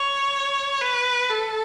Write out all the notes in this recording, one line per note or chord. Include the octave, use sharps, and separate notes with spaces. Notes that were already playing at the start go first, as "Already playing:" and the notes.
Already playing: C#5
B4
A4